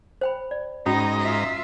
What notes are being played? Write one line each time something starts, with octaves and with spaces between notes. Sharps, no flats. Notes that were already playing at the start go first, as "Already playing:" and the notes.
C5 G5 B5
D5
G#2 C#4 D#4 F#4 D#5 A#5 B5
F4 E5